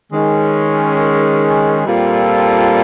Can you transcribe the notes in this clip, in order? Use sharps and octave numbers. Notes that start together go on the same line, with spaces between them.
D#3 G#3 C#4
A#2 G3 C4 F4 A4